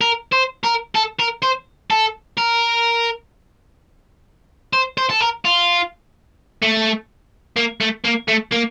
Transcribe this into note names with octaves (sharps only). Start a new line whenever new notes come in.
A#4
C5
A#4
A4
A#4
C5
A4
A#4
C5
C5
A4
A#4
F4
A3
A#3
A3
A#3
A3
A#3